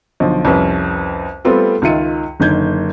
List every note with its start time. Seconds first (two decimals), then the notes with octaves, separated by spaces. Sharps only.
0.20 B1 D3 F3
0.45 C2 F2 C#4 B4
1.45 G3 A3 B3 C4 F4 A4
1.82 C#2 D#3 F4 E5 C#7 D#7
2.40 F#1 D3 D#3 G6 G#6